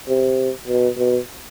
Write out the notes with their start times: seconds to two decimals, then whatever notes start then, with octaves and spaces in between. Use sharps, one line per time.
0.08 C3
0.67 B2
0.97 B2